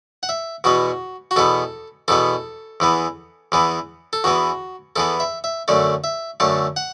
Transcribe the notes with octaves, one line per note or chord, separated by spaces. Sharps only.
F#5
E5
E2 B2 B3 F#4
F#4
E2 B2 B3 A4
E2 B2 B3 A4
E2 E3 B3
E2 E3 B3
A4
E2 E3 B3 F#4
E2 E3 B3 A4
E5
E5
F#2 D3 A3 D5
E5
F#2 D3 A3 A5
F#5